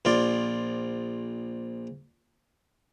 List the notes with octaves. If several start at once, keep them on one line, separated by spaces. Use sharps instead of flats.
A#1 F4 D5